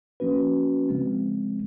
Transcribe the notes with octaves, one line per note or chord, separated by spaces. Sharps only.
F3 A#3 C#4 F#4 B4
C#3 F3 G#3 C4